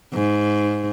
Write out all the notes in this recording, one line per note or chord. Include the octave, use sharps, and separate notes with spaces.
G#2